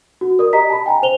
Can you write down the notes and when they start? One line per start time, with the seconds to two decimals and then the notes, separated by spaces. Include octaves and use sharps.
0.21 F#4
0.39 A#4 D5 D#6
0.53 G4 D#5 A#5 B6
0.70 A5 B5
0.86 G5 G#5 A#5
1.03 C5 F7 G7